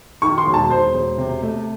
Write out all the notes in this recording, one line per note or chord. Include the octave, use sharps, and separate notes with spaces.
D#3 C#6
C6
E1
A5
E1 C5
E1
C3
A3